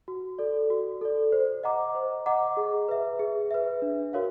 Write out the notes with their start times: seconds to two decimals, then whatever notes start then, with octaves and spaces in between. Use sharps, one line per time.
0.08 F#4
0.39 A4 D5
0.70 F#4
1.01 A4 D5
1.32 C5
1.63 D#5 F#5 A#5 D6
1.95 C5
2.26 D#5 F#5 A#5 D6
2.57 G#4
2.88 B4 E5
3.19 G#4
3.51 B4 E5
3.82 D4
4.13 F#4 A#4 C#5 F5